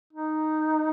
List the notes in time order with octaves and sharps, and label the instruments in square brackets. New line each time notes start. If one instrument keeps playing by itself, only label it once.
[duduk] D#4